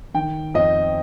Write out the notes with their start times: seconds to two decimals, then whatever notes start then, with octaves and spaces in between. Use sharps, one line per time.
0.14 D#3 G5
0.54 F2 D#5